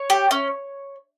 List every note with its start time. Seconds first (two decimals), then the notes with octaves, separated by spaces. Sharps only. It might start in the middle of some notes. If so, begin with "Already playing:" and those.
Already playing: C#5
0.10 G4
0.31 C#4